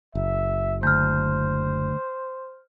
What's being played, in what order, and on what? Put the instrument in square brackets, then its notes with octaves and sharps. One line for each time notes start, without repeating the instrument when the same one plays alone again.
[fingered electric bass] F#1 [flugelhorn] E5
[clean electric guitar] D2 [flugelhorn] C5 [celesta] F6 G6